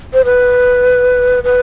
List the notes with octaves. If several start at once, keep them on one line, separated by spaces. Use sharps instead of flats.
C5
B4
B4